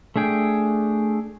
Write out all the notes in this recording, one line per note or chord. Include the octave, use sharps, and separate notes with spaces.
A3 D4 G#4 G5